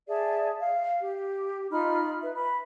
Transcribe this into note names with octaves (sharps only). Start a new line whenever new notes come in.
G#4 D5 E5 A5
F5
G4
D#4 F4 B5 F6
B4 E5
B5